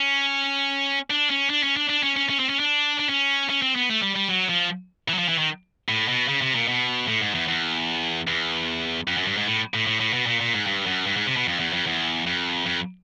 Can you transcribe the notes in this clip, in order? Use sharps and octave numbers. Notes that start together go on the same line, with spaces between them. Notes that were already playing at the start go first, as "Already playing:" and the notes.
Already playing: C#4
D4
C#4
D4
C#4
D4
D4
C#4
C#4
C#4
C4
C#4
D4
D4
C#4
C#4
C4
B3
A3
G3
G3
F#3
F3
E3
F#3
F3
E3
D#3
A2
B2
C#3
C3
A#2
B2
A2
G#2
E2
E2
E2
F2
F#2
G2
G#2
A2
A2
A2
A2
B2
A#2
A#2
G#2
G2
F#2
G2
G#2
C3
B2
F2
E2
F2
E2
F2
F2